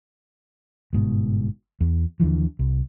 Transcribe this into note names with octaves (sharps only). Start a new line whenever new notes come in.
G1 G#2 B2
E2
D#2 D3 E3 F3
C2